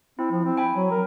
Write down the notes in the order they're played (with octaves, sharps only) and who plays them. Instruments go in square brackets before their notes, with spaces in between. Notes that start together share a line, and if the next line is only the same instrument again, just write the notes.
[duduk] C4 [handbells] E4
[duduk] F3
C4
[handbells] G5 G#5 B5
[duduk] F#3
A#4